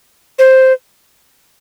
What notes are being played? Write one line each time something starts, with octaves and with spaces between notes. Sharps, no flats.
C5